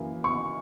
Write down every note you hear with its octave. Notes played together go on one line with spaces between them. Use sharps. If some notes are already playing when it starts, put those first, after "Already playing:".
Already playing: F#2 E3 A#3
C#6